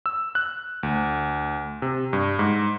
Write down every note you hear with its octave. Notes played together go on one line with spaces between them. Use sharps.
E6
F#6
D2
C3
G2
G#2